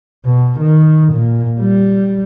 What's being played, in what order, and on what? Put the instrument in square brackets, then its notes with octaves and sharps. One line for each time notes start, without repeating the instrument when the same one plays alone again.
[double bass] B2
D#3
A#2
G3